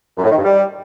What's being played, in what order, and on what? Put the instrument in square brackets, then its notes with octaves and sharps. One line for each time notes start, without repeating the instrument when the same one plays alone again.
[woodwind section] F#2
A2
D#3
G2
G3